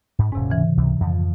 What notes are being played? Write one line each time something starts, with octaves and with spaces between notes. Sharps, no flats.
G#2
D#1 G#2 C3 C#4
C#3 E3 E5
C#2 C3
F2 F3